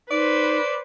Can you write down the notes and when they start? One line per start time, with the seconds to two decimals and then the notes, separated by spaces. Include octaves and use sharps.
0.11 D#4 B4 C5 D5